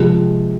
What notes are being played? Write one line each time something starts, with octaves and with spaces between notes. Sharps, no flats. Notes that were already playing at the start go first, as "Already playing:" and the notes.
Already playing: C3 F3 G#3